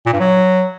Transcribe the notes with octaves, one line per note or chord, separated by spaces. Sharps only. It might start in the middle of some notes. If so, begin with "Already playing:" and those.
A#2
G2
F#3